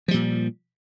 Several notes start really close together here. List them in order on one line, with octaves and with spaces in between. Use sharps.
F3 G3 A#2